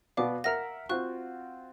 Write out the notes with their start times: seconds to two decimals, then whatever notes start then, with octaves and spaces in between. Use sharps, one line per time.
0.17 B2 B3 D5 F5 D6
0.44 A#4 E5 F#5 A#5 F6 A#6
0.89 C4 F4 F#4 C#6 F#6